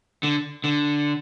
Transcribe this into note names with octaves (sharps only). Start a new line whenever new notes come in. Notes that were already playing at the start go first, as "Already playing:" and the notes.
D3
D3